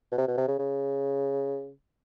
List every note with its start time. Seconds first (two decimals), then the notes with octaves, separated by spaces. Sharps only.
0.12 B2
0.18 C3
0.28 B2
0.38 C3
0.48 C#3
0.59 C#3